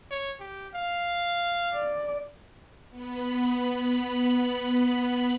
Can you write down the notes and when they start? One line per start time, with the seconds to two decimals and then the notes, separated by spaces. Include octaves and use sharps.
0.11 C#5
0.40 G4
0.74 F5
1.73 D5
2.90 B3 B5